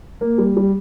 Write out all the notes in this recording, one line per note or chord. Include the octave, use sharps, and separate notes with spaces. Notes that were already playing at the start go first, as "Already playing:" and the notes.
A#3
G3
G3